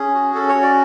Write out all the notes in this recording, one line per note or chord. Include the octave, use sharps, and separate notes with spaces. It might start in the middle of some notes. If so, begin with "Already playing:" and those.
Already playing: C#4 G#4
F#4
C#4 A4
C#5
F#4
D5